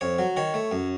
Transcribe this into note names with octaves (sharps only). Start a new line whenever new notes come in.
F2 C#5
F#3
D#3 C#5
A3
F#2